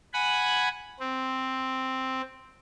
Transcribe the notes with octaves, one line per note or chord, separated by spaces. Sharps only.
F#5 G#5 B5
C4